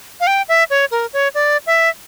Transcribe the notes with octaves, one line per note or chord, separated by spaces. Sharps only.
F5
G5
E5
C#5
A#4
C#5
D5
E5